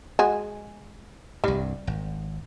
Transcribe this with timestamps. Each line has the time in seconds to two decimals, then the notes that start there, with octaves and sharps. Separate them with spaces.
0.19 G#3 F#4 G#4
1.44 C2 G2 G3
1.87 G#1